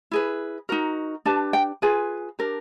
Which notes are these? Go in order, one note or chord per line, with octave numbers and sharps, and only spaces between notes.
E4 G#4 B4
D#4 F#4 A#4
D4 G4 B4 A5
G5
F4 G#4 B4 G#5
D4 G4 A#4